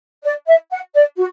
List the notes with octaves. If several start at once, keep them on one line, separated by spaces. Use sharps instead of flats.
D5
E5
F#5
D5
F#4